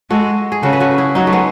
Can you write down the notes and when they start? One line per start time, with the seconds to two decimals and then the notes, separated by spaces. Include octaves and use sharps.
0.10 G#3 F#4 A4
0.52 G#4
0.63 C#3 F#4 A4
0.73 B4
0.80 F#4 A4
0.98 E4 G#4
1.15 F#3 D#4 F#4
1.27 A3
1.33 G#3 B3